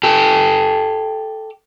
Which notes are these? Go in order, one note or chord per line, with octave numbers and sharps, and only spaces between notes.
G4 A4